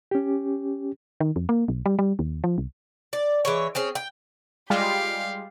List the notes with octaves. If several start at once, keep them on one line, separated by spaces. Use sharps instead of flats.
C#4 G4
D#3
F2
A#3
B1
G3
G3
D#2
F3
C2
D5
E3 G#3 C#5
C4 C#4 G#4
G5
G3 G#3 F4 G4 F5